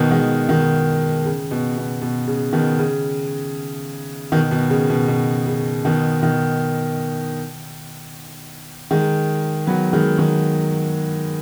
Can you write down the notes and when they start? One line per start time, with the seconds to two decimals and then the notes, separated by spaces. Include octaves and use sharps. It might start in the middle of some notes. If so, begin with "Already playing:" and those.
Already playing: B2 D#3
0.11 D#3 G#3
0.49 B2 D#3
1.26 C#3
1.51 B2
1.77 B2
2.02 B2
2.27 C#3
2.53 B2 D#3
2.78 C#3
4.32 B2 D#3
4.51 B2
4.70 C#3
4.90 B2
5.08 B2
5.47 C#3
5.85 B2 D#3
6.23 B2 D#3
8.91 D#3 G#3
9.67 F#3 B3
9.93 D#3 G#3
10.19 D#3 G#3